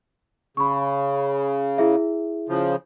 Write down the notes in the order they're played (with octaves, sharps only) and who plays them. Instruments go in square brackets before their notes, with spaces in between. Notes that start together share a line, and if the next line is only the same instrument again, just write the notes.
[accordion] C#3 [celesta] B5 C#6
[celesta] E4 G#4 E5
[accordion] C#3 F3